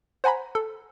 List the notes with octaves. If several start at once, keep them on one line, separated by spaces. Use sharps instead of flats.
C5 F#5 G#5 A#5 B5
A4